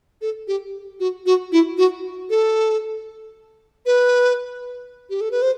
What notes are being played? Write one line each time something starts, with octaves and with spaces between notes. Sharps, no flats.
A4
G4
F#4
F#4
E4
F#4
A4
B4
G4
A4
B4
C5